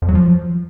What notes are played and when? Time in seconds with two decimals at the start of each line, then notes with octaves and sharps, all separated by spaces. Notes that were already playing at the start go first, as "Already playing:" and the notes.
0.02 F2
0.09 F#3
0.15 F3